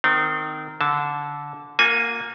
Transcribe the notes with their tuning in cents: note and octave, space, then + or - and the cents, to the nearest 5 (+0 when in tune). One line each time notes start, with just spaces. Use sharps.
D#3 -15 C4 -30
D3 -15 A5 -10
A#3 -10 F#4 -40 G#5 +0